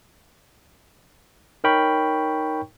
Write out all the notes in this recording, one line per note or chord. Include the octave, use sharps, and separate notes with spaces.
D#4 A#4 C#5 G5 B5 C#6